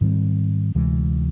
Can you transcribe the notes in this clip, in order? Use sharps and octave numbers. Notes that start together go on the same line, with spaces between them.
G#2 D#3 G3 C4
D2 C3 E3 G#3